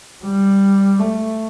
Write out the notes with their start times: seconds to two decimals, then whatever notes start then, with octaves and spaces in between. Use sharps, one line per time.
0.24 G3
0.99 A3